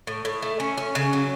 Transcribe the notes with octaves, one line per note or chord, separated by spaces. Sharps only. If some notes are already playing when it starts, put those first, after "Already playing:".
A2
A2
A3
C#4
C#4
C#3
F#3